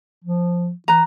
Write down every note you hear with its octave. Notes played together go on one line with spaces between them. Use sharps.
F3
E3 B4 A#5